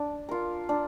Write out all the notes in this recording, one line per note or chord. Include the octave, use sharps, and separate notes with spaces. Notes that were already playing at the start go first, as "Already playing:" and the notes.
Already playing: D4
F4 A#4
D4